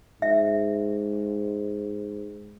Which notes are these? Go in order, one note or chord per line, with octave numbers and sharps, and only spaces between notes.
G#2 E5